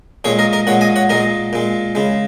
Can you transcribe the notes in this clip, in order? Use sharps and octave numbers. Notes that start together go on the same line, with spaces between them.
A#2 G#3 G#4 C#5
A#4 D#5
A#4 D#5
A#2 G#3 C#5 F#5
D#5 G#5
C#5 F#5
A#2 G#3 A#4 D#5
A#2 G#3
C#3 G#3